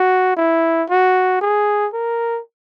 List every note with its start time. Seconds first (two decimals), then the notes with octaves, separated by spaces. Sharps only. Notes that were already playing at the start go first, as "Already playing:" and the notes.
Already playing: F#4
0.37 E4
0.90 F#4
1.41 G#4
1.93 A#4